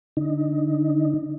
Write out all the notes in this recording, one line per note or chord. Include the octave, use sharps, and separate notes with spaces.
D3 D#4